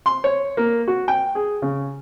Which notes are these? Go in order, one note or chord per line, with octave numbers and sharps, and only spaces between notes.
C6
C#5
A#3
F#4
G5
G#4
C#3